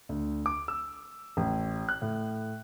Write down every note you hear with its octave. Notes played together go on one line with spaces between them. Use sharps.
D2
D6
E6
A1
F#6
A2